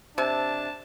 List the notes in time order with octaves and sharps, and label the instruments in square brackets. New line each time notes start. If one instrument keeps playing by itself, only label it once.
[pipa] C3 [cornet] D4 [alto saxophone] A5